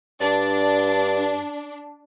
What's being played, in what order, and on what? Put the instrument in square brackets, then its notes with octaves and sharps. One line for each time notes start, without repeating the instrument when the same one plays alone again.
[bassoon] G2 [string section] D4 [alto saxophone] D5